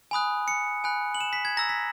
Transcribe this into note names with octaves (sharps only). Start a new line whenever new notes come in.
G#5 B5 D#6 F#6
C#7
G#5 B5 F#6
F#7
E7
B6
G#6
A#5 E6 A#6
B6